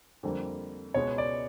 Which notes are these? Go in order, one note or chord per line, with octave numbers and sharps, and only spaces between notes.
F2 D3 G3 A#3
C#2 B2 G#3 B3 C#5
D5